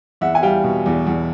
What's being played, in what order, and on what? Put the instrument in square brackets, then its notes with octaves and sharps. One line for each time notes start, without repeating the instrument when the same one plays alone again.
[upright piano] E2 E5 F#5
G#5
G3 F5 G5
B2
E2
E2